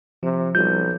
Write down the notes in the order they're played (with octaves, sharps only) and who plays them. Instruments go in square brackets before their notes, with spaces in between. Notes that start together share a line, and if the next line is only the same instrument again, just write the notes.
[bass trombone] C3 [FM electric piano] F3
[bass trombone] B1 [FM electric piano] F3 G3 [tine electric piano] G6